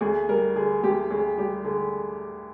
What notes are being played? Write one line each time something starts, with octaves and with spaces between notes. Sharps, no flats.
D2 G#4
G3 A#4
D3 G#4
D2 G4
D2 G#4
G3 G4
D3 G#4